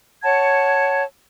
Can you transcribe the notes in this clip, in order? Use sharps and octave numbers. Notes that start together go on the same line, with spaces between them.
C#5 F#5 A5 G#6